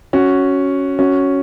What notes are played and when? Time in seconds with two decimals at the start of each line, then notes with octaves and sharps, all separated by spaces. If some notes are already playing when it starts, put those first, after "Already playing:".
0.13 C#4 F#4
0.99 C#4 F#4